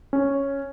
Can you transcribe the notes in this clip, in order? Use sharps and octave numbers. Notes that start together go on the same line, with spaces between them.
C#4